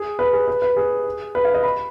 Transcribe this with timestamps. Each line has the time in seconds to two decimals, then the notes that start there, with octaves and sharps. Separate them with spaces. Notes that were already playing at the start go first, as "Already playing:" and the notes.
Already playing: G#4
0.19 B4
0.33 G#4
0.48 B4
0.62 B4
0.76 G#4
1.35 B4
1.45 F5
1.54 D#5
1.63 B5